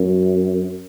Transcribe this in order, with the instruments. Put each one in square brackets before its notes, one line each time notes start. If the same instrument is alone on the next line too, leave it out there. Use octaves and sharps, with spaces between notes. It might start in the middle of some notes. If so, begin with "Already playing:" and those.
Already playing: [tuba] F#2